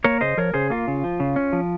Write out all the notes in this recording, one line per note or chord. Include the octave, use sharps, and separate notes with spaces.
A#3 A#4 C#5
C#3 C5 D#5
F3 A#4 C#5
C#3 G#4 C5
A#3 F4
C#3
F3
C#3
C#4
F3